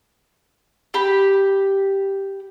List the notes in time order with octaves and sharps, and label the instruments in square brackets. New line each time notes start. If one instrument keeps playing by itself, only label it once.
[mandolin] G4 B5